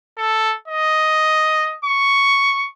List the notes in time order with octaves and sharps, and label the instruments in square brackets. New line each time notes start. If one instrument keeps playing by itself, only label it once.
[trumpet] A4
D#5
C#6